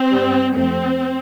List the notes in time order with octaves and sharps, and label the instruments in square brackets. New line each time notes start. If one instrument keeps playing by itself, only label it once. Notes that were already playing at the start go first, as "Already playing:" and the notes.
Already playing: [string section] C4
G2 G3
F2 F3 A3 C4